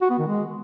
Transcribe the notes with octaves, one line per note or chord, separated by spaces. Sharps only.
F#4
B3
D#3
G#3